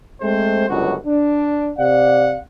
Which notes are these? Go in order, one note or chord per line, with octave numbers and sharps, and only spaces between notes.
G#3 A3 C4 C5
G1 C#2 F#2 F#4
D4
C3 D5 F5 F#5